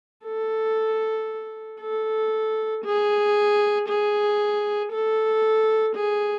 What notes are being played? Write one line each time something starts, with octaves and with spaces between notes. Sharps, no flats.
A4
A4
G#4
G#4
A4
G#4